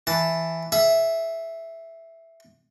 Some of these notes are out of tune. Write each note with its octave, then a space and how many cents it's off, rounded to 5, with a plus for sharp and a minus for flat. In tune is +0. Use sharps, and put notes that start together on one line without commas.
E3 +0 A5 +0
G#4 +35 E5 +0